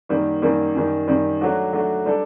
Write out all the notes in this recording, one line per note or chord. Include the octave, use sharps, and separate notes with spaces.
F#2 D#3 G3 A#3
F#2 D#3 G3 A#3
F#2 D#3 G3
F#2 D#3 G3
F#3 A3 D4 F#4
F#3 A3 D4 F#4
G3 D4 A4